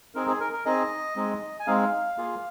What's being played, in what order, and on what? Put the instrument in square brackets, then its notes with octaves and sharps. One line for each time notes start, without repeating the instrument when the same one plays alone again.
[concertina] C4 D#4 G#4 A#4
G#4
A#4
A#4
C4 D#4 G#4 D#5
G#3 C4 D#4 G#4
G#5
G#3 C4 D#4 G#4 F5
A#3 F4 G#4